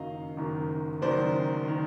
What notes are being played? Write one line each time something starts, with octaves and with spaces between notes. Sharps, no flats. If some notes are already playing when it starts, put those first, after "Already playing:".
Already playing: F#1 F#2 D#3 D#5 F5
F#1 F#2 D#3
F#1 F#2 D#3 C5 D5
D#3